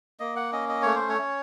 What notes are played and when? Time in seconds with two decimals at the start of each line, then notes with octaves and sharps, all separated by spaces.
0.20 A#3 D#5
0.36 F#5
0.52 C#4 D#5
0.69 D#5
0.82 A3 C#5
0.95 C5
1.09 C#5
1.18 C#4